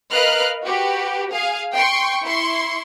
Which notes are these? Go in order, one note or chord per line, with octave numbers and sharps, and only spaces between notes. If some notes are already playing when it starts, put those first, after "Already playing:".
A#4 B4 D#5 F5 F6 F#6
F#4 G4 B4
G#4 F5
G5 C6 C#6
E4 C6 C#6